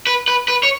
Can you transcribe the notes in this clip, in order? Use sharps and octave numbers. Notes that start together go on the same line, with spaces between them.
B4
B4
B4
C#5